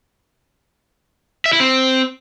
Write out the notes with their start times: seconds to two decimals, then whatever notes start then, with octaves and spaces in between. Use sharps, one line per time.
1.46 E5
1.53 E4
1.60 C4